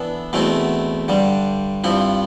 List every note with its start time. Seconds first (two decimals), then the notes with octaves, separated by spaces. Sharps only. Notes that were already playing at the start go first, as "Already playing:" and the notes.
Already playing: E3 B3 D4 A4
0.33 E2 B2 A3 C4 E4
1.08 G2 D3 G3
1.84 G2 F3 C4 E4